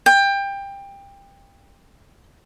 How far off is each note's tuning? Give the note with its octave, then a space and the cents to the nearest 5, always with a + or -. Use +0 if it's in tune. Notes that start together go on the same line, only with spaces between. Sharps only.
G5 +20